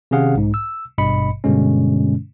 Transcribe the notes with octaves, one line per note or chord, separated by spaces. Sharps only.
C3 D#3 C#4 G#4 F5 F#5
B1 G#2
E6
G#1 G2 B2 D#5 B5 C#7
G2 B2 D3 G#3 C#4